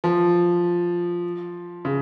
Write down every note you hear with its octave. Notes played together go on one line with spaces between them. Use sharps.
F3
C#3